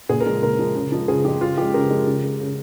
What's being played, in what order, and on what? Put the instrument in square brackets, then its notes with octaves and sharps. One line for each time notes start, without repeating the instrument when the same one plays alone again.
[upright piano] A#2 G#4
A#4
F3 G#3
A#2 A#4
F3 G#3
C#3
F3 G#3
C#3 G#4
F3 G#3 G4
C#3 F4
F3 G#3 G4
C#3 A#4
F3 G#3
C#3
G#3
C#3